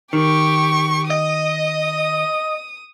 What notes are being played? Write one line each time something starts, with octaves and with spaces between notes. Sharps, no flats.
D#3 G4 C#6
D#5 D#6